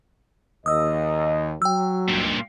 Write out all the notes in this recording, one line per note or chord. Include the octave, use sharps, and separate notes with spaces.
D#2 D#5 D#6 E6
F#3 G5 E6
C#2 G2 A#2